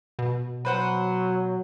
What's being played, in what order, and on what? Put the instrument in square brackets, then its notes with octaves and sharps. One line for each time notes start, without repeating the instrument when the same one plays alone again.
[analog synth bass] B2
[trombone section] F#3 [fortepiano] B4 C5 F#5